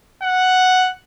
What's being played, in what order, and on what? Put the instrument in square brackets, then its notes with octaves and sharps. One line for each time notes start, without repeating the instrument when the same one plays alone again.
[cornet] F#5